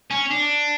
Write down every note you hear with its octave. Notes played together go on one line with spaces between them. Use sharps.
C#4
D4